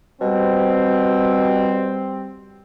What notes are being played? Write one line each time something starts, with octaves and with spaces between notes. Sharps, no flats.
B2 G3 C4